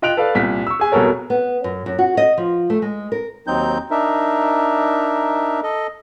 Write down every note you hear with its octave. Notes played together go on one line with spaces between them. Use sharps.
F4 D#5 G5 F#6 D7 F7
A4 B4 D5 F5
C2 A#2 B6
C#6 E6
G#4 G#5
E1 C2 B2 A4 A#4 C#5
B3
F#2
F#2
F#4
D#5
F3
A3
G#3
A#4
D#2 F#3 C4 D#4 G6
D4 D#4 A#4 E5
A4 D#5